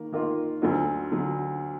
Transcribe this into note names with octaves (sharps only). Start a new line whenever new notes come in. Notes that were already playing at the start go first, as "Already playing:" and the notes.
Already playing: D#3 A#3
D#3 A#3 F4
D2 D3 F#3
D3 F#3